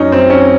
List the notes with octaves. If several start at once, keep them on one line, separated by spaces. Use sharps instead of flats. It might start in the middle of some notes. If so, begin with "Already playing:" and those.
Already playing: F#2 C#4 D#4
F#2 C4
C#4